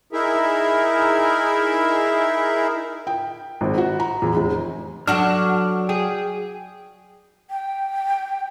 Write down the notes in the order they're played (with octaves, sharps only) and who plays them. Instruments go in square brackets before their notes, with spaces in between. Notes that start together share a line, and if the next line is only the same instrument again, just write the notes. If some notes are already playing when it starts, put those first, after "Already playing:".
[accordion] D#4 E4 G#4 A#4 E5
[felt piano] G5
G#1
F#4
A#5
E2
F1
[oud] F#3 F#4 A4 [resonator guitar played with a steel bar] D4 [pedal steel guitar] F6
[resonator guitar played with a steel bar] G#4 [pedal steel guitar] G5
[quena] G5